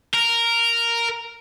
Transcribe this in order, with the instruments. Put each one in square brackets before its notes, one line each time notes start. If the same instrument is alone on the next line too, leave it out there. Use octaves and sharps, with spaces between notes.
[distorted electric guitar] A#4